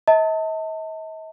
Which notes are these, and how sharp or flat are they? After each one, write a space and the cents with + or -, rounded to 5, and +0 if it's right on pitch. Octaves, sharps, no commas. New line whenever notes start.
D#5 +45 A5 +30